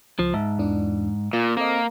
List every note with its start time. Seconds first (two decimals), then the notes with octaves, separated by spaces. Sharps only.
0.19 C#2 F3
0.34 G#2 E5 A5
0.59 E2 E3 D4
1.33 A#2 F4
1.57 A#3 C4 A4 D#5